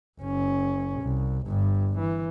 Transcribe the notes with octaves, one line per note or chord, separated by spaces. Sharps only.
F#1 C#4
C2
G1 G2
E3